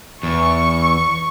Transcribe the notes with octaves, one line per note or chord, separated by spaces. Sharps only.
E2 C#6